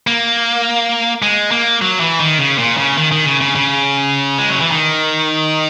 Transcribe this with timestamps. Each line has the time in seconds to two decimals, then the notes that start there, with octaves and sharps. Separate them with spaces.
0.07 A#3
1.22 G#3
1.51 A#3
1.82 F#3
2.00 E3
2.20 D#3
2.39 C#3
2.58 A#2
2.77 C#3
2.97 D#3
3.12 D#3
3.26 C#3
3.41 C#3
3.55 C#3
4.38 G#3
4.49 F#3
4.60 E3
4.71 D#3